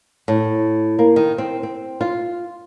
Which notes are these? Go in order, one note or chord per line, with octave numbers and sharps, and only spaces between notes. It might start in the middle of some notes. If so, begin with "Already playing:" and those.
A2
A#3
D#3
C4
C4
F4